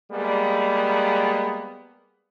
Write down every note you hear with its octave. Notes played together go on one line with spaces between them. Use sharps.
G3 G#3 A#3 B3